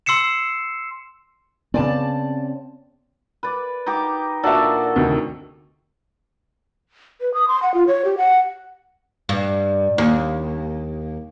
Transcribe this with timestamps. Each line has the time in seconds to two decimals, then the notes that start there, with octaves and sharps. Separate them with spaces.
0.06 C6 E6 C7 C#7 E7
1.74 C#3 B3 C4 D5 G#5 A5
3.43 B4 D5
3.86 D#4 G4 D6
4.43 A#2 D4 F#4 A4 D5 E5
4.96 D2 C3 D#3
7.21 B4
7.34 D#6
7.48 C6
7.63 F#5
7.74 F4
7.87 C#5
8.05 G4
8.18 F#5
9.29 G2
9.98 D#2